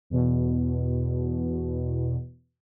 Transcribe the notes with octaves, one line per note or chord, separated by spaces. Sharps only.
E2 B2